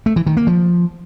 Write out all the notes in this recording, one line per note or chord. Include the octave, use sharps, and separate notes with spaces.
A3
E3
D#3
A#3
F3